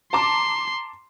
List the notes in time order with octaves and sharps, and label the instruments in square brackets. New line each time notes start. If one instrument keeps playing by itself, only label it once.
[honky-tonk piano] A5 A#5 D6 [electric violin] C6